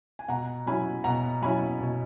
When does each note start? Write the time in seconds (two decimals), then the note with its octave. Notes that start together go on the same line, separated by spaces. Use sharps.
0.19 G#5
0.28 B2 F#5 A#5
0.66 F#3 C#4 E4 G#5 B5
1.04 B2 F#5 A#5
1.42 F#3 C#4 E4 G#5 B5
1.80 B2